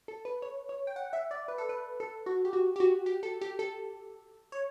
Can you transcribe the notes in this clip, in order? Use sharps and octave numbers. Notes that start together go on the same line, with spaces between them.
A4
B4
C#5
C#5
G5
F#5
E5
D5
B4
A4
B4
A4
F#4
G4
F#4
G4
F#4
G4
A4
G4
A4
C#5